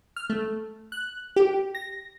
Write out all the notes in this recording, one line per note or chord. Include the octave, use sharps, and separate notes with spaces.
F6
A3
F#6
G4
A#6